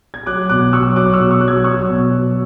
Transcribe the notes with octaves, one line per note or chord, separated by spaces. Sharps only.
G#6
F#3 D6 F#6
B2 D6 F#6
F#3 C#6 E6
F#3 D6 F#6
C#6 E6
B2
C#6 E6
F#3 F#6
E6 G#6
F#3 C#6 E6
B2
F#3